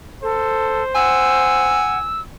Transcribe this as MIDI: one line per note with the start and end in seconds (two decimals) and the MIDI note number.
0.23 0.83 69
0.23 1.83 72
0.95 1.98 78
0.95 2.09 80
0.95 2.21 88